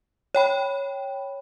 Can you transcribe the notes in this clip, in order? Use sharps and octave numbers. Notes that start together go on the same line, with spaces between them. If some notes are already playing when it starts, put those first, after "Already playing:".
C#5 G5 B5